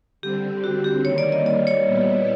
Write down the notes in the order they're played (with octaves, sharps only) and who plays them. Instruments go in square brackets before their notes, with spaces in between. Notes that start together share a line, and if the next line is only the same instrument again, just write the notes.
[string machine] D3 G3 C4 [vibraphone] G4
[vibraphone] F#4
G4
[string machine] D#3 G3 A#3 [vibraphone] C#5
[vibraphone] D5
D#5
D5
C#5
[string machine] A#2 G3 B3 E4